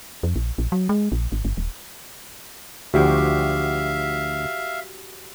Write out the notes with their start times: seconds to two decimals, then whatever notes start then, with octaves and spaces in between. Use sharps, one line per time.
0.23 F2
0.36 A#1
0.58 A#1
0.72 F#3
0.89 G#3
1.12 A#1
1.32 G#1
1.45 G1
1.57 D#1
2.94 D2 F3 F#4 G4 E5 F5